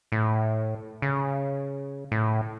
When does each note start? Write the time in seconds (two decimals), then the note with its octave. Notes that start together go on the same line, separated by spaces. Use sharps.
0.12 A2
1.02 C#3
2.12 A2